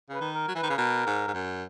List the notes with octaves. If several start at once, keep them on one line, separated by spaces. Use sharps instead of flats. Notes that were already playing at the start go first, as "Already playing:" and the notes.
C#3 B4
D#3
A#4
F#3
E3 B4
D#3
C#3 B4
B2 A#4
G#2
G#2
F#2